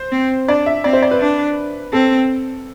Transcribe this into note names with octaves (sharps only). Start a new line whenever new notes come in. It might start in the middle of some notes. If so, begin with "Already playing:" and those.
Already playing: C5
C4
D4 D5
E5
C4 D5
C5
D5
B4
D4
C4 A4